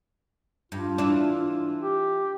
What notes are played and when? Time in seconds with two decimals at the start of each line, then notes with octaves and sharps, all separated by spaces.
0.72 G2 F4
0.98 E3 D4
1.82 G4